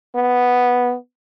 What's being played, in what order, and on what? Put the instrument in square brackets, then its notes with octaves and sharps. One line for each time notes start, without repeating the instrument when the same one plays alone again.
[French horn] B3